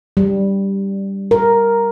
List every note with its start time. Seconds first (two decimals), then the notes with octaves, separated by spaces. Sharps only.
0.17 G3
1.31 A#4